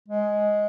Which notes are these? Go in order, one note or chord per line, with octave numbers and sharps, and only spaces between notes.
G#3